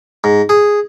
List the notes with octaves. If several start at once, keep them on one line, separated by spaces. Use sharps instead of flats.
G#2
G#4